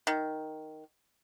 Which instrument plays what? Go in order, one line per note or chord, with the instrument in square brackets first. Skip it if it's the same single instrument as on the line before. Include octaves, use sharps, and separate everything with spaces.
[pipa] D#3